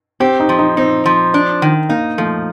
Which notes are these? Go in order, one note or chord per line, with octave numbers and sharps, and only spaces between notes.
C4 G4
D#4
F3
D#4
C4 D#4
F3
D4
D#3
A#3 D#4
F3 A3